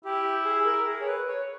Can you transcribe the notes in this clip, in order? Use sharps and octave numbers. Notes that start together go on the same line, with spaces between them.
E4 G4
G#4
A#4
G#4
C#5
B4
C#5